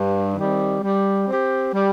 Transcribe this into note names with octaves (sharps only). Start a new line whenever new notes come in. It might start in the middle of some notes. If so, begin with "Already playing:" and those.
Already playing: G2
D#3 G3 C4
G3
C4 G4
G3